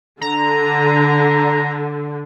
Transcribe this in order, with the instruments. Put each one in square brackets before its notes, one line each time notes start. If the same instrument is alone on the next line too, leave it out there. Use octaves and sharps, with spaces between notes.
[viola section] D3 [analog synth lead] A#5